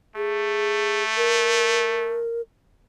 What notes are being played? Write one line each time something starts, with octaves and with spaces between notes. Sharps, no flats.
A3 G#4
A#4